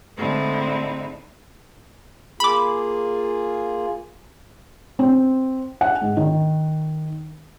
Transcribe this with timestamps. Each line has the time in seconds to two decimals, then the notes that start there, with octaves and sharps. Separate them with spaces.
0.17 A2 D3 G#3 C4 D#4 E4
2.40 A#3 F4 G#4 B5 D6
4.99 C4
5.81 F#5
6.01 G#2
6.17 D#3